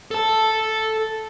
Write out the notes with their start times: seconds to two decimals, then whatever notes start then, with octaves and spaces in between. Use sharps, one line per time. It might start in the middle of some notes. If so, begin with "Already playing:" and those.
0.11 A4 A5